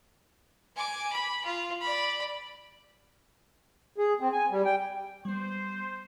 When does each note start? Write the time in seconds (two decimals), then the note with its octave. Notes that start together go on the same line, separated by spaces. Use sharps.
0.76 G#5 D6
1.12 B5
1.45 F4
1.80 D5 B5
3.98 G#4
4.20 C4
4.32 G#5
4.50 G3
4.65 G5
5.25 G3 B3 C5